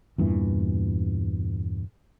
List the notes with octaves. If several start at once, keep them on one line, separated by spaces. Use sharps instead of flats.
E2 G2 A#2 E3